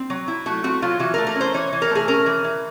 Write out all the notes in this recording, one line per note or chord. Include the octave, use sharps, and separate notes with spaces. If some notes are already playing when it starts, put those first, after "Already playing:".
Already playing: C4
F#3
E4
A3 F#4
C4 F#4
F#3 F4
E3 F#4
A#4
A3
A#4
C#4
C5
E3 C#5
E3
A#4
A3 G#4
C#4 A#4
E3
E3